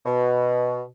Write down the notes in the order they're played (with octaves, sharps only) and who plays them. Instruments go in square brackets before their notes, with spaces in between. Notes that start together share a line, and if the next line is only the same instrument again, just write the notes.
[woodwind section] B2